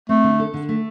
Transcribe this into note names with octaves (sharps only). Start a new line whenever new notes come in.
A3 C4
D3
A4
D3
A3